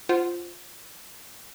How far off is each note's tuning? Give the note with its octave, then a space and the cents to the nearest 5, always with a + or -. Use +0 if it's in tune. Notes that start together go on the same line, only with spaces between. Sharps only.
F4 +0 C5 -5 F#5 +0